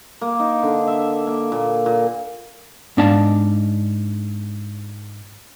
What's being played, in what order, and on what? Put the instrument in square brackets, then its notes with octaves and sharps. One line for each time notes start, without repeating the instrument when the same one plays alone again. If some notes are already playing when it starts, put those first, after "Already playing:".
[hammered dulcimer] A#3
D#4
D3
E5
A#3
A#2
A#2
[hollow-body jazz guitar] G#2 B3 D4 D#5 F5 A5